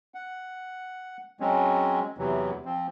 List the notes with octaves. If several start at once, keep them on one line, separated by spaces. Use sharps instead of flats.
F#5
F#3 G#3 C4 C#4
E2 C3 E3 F#3
F3 C4